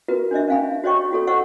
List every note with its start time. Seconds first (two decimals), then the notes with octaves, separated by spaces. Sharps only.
0.08 F4 F#4 A#4 B4
0.31 D4 C5 D#5 E5
0.48 C#4 D#4 F5 G#5 B5
0.84 F#4 C5 C#5 D#5 G5 C#6
1.11 F4 F#4 A4 C#5
1.27 C5 D#5 F#5 C#6 D6 E6